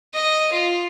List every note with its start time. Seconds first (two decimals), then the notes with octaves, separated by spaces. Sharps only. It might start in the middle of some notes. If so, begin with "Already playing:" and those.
0.14 D#5
0.52 F4